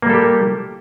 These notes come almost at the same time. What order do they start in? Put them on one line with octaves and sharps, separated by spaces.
A#3 G3 A4 G4